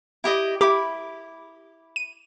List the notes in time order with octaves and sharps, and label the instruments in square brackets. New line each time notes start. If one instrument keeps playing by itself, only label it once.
[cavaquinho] E4 G4 D#5
[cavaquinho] E4 B5 D6 [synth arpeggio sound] G4
[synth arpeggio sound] D#7